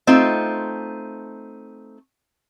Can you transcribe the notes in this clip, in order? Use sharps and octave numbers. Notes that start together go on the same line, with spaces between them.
A3 C4 D#4 F4